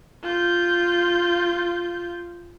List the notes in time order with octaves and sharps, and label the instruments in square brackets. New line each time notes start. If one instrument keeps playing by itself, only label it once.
[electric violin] F4 G6